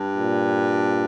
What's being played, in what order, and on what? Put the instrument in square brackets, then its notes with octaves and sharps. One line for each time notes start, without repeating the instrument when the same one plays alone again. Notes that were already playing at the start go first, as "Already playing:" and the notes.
Already playing: [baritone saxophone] G2
[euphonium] A#2